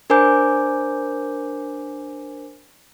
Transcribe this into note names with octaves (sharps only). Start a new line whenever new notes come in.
D4 A#4 C5 G#5 D6 G6